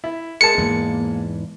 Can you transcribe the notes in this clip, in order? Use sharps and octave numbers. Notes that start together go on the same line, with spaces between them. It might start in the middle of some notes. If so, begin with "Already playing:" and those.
E4
G#3 A#4 A5 C#7
E2 G#2 E3 A#3